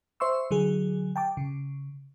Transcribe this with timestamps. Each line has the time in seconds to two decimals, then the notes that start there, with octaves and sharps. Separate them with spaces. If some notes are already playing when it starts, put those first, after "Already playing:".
0.20 C5 E5 C6 C#6 E6
0.51 D3 F#3 G#4
1.16 G5 A5 D6
1.37 C#3